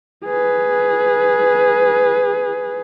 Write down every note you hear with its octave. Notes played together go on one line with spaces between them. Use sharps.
G#4 B4